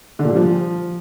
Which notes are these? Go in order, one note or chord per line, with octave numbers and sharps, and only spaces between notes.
D3
A#2
G3
F3